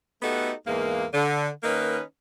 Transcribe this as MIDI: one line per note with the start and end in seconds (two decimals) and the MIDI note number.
0.22 0.52 57
0.22 0.52 59
0.22 0.52 63
0.22 0.52 66
0.22 0.52 67
0.22 0.52 69
0.66 1.04 40
0.66 1.04 44
0.66 1.04 52
0.66 1.04 56
0.66 1.04 58
1.14 1.48 50
1.63 2.00 51
1.63 2.00 58
1.63 2.00 61
1.63 2.00 63
1.63 2.00 71